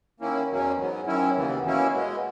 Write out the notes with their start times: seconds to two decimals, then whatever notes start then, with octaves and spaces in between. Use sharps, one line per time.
0.20 D#3 A#3 C#4 E4
0.49 E2 B2 F#3 A#3 C#4
0.78 G#2 F#3 B3
1.06 F#2 D#3 F#3 C#4 E4
1.36 D#2 C#3 E3 B3
1.64 B2 A#3 C#4 E4
1.93 B2 G#3 B3